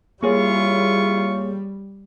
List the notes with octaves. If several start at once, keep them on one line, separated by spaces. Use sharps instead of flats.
G3 A#3 E4 F4 G#4 C#5 C#6